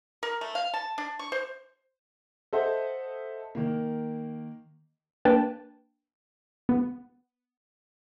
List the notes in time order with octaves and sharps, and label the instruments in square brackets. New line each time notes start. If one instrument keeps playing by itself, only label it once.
[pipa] A#4
A3
F5
A5
D4
C#6
C5
[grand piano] A4 C5 D#5 E5 F#5
D#3 A#3
[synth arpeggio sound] A#3 D4 B4 G5 A5
B3